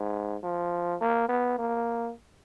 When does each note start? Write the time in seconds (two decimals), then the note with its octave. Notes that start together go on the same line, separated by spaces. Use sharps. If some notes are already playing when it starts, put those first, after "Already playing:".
Already playing: G#2
0.43 F3
1.01 A#3
1.29 B3
1.58 A#3